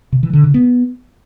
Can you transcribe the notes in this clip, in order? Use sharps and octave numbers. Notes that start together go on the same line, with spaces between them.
C3
E3
D3
C#3
B3